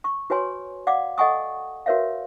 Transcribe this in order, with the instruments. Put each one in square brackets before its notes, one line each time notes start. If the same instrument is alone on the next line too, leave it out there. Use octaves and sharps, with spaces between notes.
[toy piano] C#6
F#4 B4 C#5 G#5 C6
D5 F5 F#5 D6
A4 D#5 F#5 G#5 C#6 D#6
F#4 A#4 B4 C#5 E5 F5